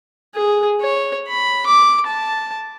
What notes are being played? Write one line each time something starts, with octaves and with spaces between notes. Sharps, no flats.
G#4
C#5
B5
D6
A5